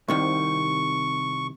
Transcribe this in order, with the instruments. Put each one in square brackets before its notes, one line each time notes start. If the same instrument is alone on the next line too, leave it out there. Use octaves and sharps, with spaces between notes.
[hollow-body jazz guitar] C2 C3 D#3 [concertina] C#6